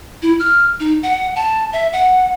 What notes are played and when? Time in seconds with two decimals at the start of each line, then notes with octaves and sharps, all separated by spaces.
0.22 E4
0.40 F6
0.80 D#4
1.03 F#5
1.36 A5
1.73 E5
1.93 F#5